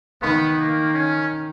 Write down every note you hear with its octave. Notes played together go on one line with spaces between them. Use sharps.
D#3 B3
A#3
C#4